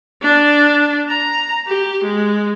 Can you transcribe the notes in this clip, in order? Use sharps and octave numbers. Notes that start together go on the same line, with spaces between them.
D4
A#5
G4
G#3